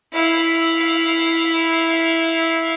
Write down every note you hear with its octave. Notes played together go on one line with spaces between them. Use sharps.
E4 F5